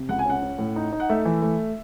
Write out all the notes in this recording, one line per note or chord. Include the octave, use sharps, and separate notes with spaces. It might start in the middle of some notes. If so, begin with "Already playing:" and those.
Already playing: C3
C#2 F#5
G#5
C#4 F#5
C#4
A2
D#4
D#4
F#5
A3 E5
E3
A3